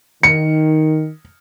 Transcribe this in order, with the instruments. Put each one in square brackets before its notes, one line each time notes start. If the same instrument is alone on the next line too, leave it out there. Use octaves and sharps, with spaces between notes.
[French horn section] D#3 [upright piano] C#7